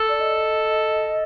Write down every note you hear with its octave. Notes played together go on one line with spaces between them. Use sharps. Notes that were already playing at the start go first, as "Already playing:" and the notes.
Already playing: A4
D5
D#5